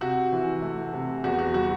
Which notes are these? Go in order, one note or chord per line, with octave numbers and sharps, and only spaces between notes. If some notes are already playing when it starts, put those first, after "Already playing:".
C3 F#4
E3
A3
C3
E2 F#4
F#4
G3 F#4